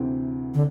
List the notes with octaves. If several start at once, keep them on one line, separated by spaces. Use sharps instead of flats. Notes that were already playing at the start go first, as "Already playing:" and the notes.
Already playing: D2 C3 E3 C4
D3